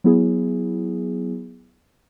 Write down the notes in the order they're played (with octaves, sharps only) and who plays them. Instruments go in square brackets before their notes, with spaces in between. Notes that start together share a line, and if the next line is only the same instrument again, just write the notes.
[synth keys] F#3 B3 E4 G#4